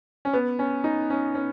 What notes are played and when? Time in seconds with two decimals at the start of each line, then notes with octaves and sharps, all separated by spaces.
0.25 C#4
0.33 B3
0.59 C#4
0.84 D#4
1.10 C#4
1.35 C#4